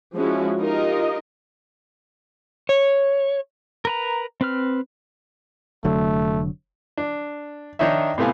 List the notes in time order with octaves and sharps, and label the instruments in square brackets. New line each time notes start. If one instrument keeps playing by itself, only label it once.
[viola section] F3 G#3 C#4 E4 F#4
D#4 F4 G4 A#4 D#5
[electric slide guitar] C#5
[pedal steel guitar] A#4 B4 A#5
C4 B4 F6
[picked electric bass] F1 D3 F#3 [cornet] A3
[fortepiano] D4
D#3 D4 D#4 C#5 E5
A2 C3 A3 B3 F5 G#5